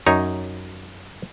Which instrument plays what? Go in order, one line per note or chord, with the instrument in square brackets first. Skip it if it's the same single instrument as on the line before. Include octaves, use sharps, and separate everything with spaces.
[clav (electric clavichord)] F#2 D#4 C#5